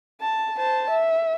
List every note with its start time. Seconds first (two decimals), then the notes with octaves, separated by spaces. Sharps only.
0.21 A5
0.57 C5 A5
0.90 E5